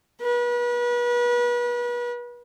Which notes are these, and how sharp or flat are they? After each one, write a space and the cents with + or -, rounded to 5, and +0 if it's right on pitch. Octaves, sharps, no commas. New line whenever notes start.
B4 -35